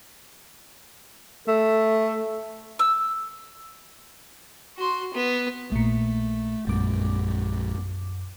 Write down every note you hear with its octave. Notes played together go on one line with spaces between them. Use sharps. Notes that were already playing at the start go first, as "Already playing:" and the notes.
A3 A4
E6
F#4 C6
B3
A#1 A#2 A3
A#1 F#2 G#3 D6